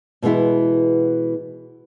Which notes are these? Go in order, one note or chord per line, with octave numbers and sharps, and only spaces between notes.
B2 E3 G#3 B3 E4